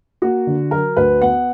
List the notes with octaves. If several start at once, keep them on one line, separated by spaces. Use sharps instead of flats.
A#3 F#4
D3
F#3 A#4
D2 B4
B3 F#5